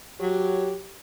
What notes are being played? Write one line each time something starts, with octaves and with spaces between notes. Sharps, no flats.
F#3 G4